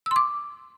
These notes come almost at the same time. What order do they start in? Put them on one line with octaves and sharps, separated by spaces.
E6 C6 D6